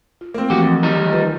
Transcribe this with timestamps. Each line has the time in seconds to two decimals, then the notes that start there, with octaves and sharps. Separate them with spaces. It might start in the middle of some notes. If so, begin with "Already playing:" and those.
0.21 F4
0.34 A3 A#3 C4
0.50 E3 F3 A3 F#4 G4
0.62 F2
0.83 D#3 G3 D#4 A#4
1.13 F4 B4